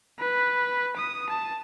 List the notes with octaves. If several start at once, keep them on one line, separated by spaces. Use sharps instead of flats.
B4
D#6
A5